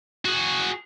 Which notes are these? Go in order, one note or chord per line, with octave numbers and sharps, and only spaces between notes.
F#4 G#4